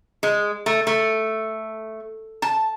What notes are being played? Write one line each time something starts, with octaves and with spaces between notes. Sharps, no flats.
G#3
A3
A3
A5